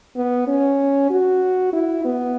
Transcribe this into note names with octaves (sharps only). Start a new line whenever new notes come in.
B3
C#4
F#4
E4
B3